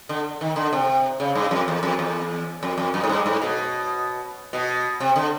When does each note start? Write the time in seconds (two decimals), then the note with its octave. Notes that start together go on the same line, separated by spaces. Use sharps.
0.09 D3
0.41 D#3
0.56 D3
0.73 C3
1.20 C#3
1.35 G2
1.51 F2
1.68 E2
1.83 F2
1.99 E2
2.63 F2
2.78 F2
2.94 F#2
3.04 G#2
3.09 G2
3.26 G#2
3.42 B2
4.53 B2
5.00 C3
5.16 D3